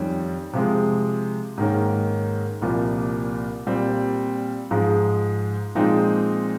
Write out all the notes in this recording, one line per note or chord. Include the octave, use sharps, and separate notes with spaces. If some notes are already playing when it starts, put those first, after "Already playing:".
Already playing: F2 D#3 G3 C#4
C3 F3 G#3
G#2 D#3 A#3 C#4
C2 A#2 F3 A#3
A#2 G3 C4
G#2 F3 G#3
A#2 F3 G#3 C4 D#4